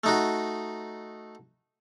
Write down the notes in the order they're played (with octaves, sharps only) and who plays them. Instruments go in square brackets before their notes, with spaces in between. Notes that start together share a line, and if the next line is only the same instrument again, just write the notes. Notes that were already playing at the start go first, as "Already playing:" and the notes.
[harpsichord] A3 D#4 F#4